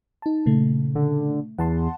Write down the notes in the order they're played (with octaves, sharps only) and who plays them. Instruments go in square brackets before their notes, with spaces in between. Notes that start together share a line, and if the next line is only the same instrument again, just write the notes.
[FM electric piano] D#4 A5
A#2 C#3 A3
[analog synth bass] D3
[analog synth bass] E2 [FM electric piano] F#5 A5 C6